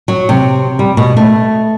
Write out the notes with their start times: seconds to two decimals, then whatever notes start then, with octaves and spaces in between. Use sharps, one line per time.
0.08 F#3
0.29 C3
0.79 G3
0.97 B2
1.17 A3